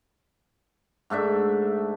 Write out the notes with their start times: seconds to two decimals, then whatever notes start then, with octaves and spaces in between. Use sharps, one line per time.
1.10 G#2 A3 D4 E5